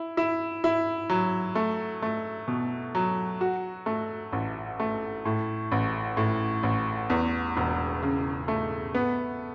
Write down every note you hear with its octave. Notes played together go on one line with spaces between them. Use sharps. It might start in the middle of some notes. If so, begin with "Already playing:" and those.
Already playing: E4
E4
E4
F#3
A3
A3
B2
F#3
F#4
A3
A1
A3
A2
A1
A2
A1
E2
E1
C#3
A3
B3